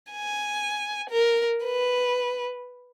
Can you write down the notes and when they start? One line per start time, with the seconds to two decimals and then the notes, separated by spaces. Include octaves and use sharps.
0.12 G#5
1.10 A#4
1.64 B4